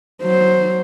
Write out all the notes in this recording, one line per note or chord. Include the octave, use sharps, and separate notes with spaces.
F#3 C5